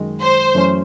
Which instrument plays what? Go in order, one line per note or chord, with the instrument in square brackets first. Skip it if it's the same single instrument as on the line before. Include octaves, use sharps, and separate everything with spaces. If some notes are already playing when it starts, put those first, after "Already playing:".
Already playing: [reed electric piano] F#2 D#3 G#3
[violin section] C5
[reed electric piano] F#2 E3 A3 C#4